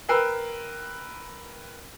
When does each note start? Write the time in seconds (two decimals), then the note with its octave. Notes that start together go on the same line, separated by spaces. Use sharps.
0.09 A#4 B4 G5 E6 C7